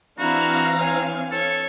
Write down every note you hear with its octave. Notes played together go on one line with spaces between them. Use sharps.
E3 C4 D4 E4 F#4 F5 A#5
C#5 G#5
A4 C#5